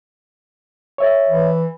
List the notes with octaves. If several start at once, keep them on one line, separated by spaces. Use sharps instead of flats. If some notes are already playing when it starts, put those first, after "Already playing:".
C#5 E5
E3